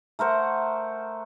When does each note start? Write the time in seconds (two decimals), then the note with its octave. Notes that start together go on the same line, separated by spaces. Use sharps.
0.19 A3 A#4 C5 F#5